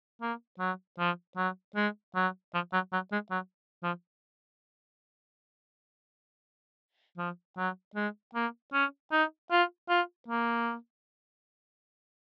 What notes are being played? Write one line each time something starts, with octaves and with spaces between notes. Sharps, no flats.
A#3
F#3
F3
F#3
G#3
F#3
F3
F#3
F#3
G#3
F#3
F3
F3
F#3
G#3
A#3
C#4
D#4
F4
F4
A#3